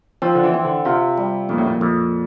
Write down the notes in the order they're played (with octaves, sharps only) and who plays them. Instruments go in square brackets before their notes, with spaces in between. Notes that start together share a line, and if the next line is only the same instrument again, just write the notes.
[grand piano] F3 [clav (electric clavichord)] C4
[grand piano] D3
E3
[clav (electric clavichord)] C4
[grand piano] D3
[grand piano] C3 [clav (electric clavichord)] F4
[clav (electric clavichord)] G3
[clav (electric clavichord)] F2 [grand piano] A#2
[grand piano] A2
A#2
[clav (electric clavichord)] F2